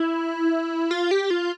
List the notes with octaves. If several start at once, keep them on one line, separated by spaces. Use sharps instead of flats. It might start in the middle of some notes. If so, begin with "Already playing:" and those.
Already playing: E4
F4
G4
F4